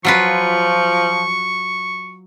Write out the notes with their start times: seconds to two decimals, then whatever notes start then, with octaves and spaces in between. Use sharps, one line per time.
0.05 F3 F#3 F4 B4 C#6